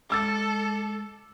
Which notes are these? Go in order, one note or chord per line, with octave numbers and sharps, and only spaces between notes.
G#3 A4 D6 E6 A6